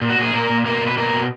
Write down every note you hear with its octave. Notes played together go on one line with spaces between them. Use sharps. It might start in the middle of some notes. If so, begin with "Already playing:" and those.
A#2
F#4
A#2 G#4
A#2 A#3 A#4
A#2
B2 A#3 A#4
B2
B4
B2 A#3 A#4
B2